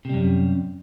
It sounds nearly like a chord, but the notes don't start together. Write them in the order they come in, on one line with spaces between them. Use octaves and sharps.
C3 G3 F#2